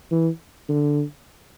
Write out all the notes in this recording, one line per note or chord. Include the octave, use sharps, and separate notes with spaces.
E3
D3